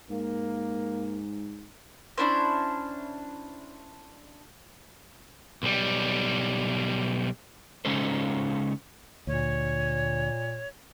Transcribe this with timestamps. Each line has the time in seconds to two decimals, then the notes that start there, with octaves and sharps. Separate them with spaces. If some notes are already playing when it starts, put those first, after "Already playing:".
0.10 G#2 A#3
2.18 C#4 D4 E4 C5
5.63 B1 G3
7.85 C#3 G#3 C#4 D#4 A4 C5
9.27 D2 A#2 C#5